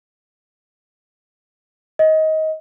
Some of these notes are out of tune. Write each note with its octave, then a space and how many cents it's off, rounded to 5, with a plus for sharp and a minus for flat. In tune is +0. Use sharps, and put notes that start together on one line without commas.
D#5 +20